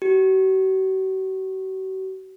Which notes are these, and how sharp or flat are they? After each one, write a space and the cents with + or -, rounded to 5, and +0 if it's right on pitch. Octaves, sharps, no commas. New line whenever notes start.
F#4 +45